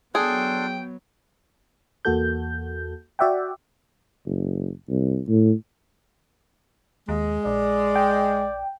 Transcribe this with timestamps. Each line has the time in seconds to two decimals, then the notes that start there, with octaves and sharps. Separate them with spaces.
0.15 F#3 B3 D4 G#4 A4 G5 C6
2.05 E2 A#3 F#4 A4 G6
3.19 F#4 D5 E5 F#5 G5
4.25 F#1
4.89 C2
5.28 A2
7.09 D#2 G#3
7.46 A#1 D5
7.96 G5